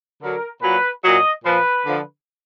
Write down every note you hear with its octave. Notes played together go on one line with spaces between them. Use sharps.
D3 F#3 A#4
A#2 F#3 B4
A#2 F#3 D#5
A#2 F3 B4
D3 F3